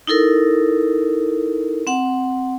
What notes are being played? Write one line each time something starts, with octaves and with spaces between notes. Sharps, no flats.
D#4 E4 A4 A#4
C4 F#5